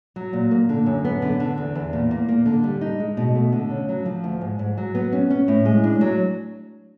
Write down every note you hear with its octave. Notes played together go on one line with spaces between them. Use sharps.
F#3
A#2
A#3
D3
F#2
B3
D3
D3
E2
E2
A#2
A#3
A#3
D3
G3
D#4
G#3
B2
A3
D3
C#3
F#3
F3
D2
G#2
G#2
F#3
B3
C#4
C#4
A2
G#3
D4
F#3